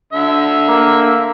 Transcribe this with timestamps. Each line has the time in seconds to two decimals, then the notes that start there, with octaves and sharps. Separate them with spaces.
0.13 D3 E5
0.68 A#3